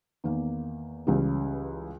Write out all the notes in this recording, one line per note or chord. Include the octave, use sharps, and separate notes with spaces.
E2 D#3 A#3
C#2 C#3 E3 G3